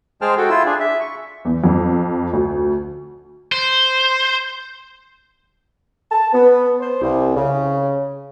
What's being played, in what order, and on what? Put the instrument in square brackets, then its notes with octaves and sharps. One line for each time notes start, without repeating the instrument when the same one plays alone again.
[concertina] G#3 G#4 C5 G5 A5 F6
F#4 A4 G5
E4 F4 E6
D4 G#4
E5
C#6
[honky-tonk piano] E2
F2
D2
[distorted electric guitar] C5
[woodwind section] A5
B3
C5
C2
C#3